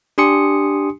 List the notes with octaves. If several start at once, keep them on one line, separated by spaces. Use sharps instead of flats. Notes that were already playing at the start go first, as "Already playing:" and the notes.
D4 G4 G#5 C6 D#6 C#7